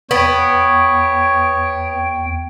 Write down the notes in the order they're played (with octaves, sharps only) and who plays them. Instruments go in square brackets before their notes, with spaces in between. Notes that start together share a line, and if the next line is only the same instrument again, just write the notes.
[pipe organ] E2 G5 [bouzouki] B3 [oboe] C#5